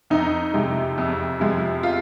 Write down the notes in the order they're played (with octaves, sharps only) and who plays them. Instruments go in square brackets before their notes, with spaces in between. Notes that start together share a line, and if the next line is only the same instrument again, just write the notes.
[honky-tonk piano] F2 D#4
C3 F3 G#3
F2
C3 F3 G#3
F4